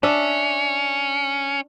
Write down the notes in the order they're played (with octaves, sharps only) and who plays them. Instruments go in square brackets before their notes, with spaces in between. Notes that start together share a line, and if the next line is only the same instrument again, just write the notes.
[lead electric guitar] C#4 [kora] D4 E5